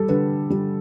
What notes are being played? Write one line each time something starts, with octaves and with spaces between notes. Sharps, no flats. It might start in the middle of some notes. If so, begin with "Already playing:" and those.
Already playing: G3 A4
D3 B4
G3